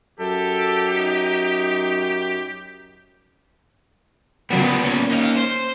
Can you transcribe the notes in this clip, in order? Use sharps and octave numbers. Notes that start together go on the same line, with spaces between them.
F#2 G4 A4
D#4
A#2 C#3 F#3 G3 B3
B3
A#3 C#4
D#4 F5
C5